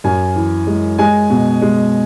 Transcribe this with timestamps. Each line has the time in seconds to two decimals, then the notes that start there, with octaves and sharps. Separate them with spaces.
0.04 F#2 G#5
0.35 E3
0.67 G#3
0.99 G#3 G#5
1.30 B2
1.62 G#3